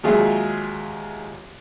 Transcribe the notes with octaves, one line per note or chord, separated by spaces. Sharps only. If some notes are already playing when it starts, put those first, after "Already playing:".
D#2 F#3 G#3 F4 G#4 E5